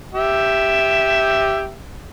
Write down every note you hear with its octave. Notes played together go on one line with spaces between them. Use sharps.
G4 E5